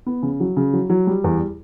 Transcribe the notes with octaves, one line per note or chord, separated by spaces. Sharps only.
B3
C#3
F#3
C#3
F#3
F#3
G3
E2